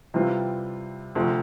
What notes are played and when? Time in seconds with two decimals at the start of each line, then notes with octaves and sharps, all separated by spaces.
0.14 C3 E3 G3 C4 F4
1.15 D2 C3 F3